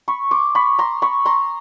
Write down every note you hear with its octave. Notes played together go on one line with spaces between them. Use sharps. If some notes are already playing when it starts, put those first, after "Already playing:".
B5 C#6
C6 D6
B5 C#6
A#5 C6
B5 C#6
A#5 C6